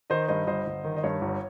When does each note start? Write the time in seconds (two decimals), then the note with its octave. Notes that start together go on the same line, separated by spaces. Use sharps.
0.10 D#3 C5 D#5
0.28 G2 C5 D#5
0.47 G1 C5 D#5
0.66 G1
0.84 D#3
0.97 D#5
1.03 G2 C#5
1.21 G1